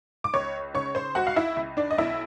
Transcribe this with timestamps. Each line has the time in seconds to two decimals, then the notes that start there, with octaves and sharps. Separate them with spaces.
0.24 D6
0.34 C#2 C#5 C#6
0.74 C#3 C#5 C#6
0.95 C5 C6
1.15 C#2 F#4 F#5
1.27 F5
1.36 E4 E5
1.57 C#2
1.77 D4 D5
1.91 D#5
1.98 B1 E4 E5